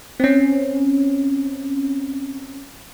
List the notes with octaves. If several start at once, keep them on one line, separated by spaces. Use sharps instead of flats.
C4 C#4